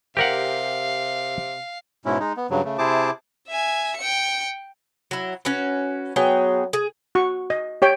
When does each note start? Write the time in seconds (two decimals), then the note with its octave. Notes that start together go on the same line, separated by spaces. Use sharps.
0.17 C3 G4 A#4 F5 F#5
2.05 G#2 B2 G#3 C#4 E4
2.20 G#3 D#4
2.37 B3
2.50 G2 C#3 F#3
2.65 C#3 A3
2.78 C3 E4 G#4 C5 A5 D6
3.48 E5 G#5
3.96 G5 C#7
5.11 F#3 E4
5.45 C#4 F#4 B4
6.16 F#3 B3 G#4 G5
6.73 G#4
7.15 F#4 C#6
7.50 D#5
7.82 G4 C#5 G5